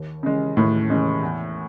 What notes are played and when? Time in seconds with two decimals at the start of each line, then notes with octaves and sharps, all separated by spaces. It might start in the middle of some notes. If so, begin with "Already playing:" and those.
Already playing: D#2
0.23 C#3 E3 G#3 C#4
0.57 D#2 A2
0.90 C#3 E3 G#3 C#4
1.22 E2